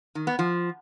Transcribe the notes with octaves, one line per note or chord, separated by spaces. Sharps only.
D#3
B3
F3